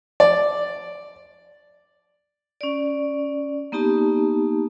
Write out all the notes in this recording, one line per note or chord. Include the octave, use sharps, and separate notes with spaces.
D5
C#4 D5
A#3 B3 D#4 G4 A5